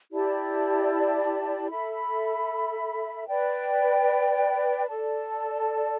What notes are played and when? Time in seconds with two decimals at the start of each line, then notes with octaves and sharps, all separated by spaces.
0.11 E4 G4 D5 A5
1.69 A4 E5 B5
3.27 B4 D5 G5
4.86 A4 D5 A5